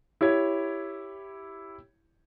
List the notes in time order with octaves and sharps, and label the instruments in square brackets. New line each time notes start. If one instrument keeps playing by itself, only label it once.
[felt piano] E4 G4 C#5 G#6